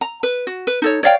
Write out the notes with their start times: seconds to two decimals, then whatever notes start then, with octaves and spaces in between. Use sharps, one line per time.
0.01 A#5
0.23 B4
0.47 F#4
0.67 B4
0.82 D#4 A4 C#5
1.03 C#5 D5 F5 G5